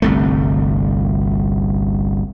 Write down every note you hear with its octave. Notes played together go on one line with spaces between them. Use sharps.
G1 C2 A3